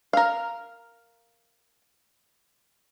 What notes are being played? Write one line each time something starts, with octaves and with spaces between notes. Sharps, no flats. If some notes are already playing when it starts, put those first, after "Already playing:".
A#4 F5